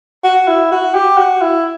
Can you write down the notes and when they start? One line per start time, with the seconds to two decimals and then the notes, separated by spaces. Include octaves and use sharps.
0.24 F#4
0.48 E4
0.72 F#4
0.95 G4
1.18 F#4
1.42 E4